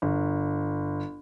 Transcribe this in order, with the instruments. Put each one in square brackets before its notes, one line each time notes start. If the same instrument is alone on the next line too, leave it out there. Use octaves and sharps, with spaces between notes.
[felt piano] G1